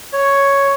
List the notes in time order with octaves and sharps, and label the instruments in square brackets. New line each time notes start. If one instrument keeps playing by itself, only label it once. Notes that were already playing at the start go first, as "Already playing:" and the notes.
[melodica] C#5